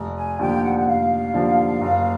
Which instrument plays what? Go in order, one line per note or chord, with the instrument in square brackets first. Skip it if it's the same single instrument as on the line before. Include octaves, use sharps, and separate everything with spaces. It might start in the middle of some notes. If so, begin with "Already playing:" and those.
Already playing: [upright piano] F1
[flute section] G#5
[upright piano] D#2 D3 F3 [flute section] G5
[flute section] F#5
F#5
[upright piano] F1 [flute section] F5
[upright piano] D#2 D3 F3
F#1